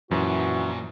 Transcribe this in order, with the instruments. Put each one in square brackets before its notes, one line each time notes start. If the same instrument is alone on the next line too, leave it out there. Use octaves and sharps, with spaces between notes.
[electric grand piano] F#2 [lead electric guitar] A#2 F3 [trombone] E3 [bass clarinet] F#4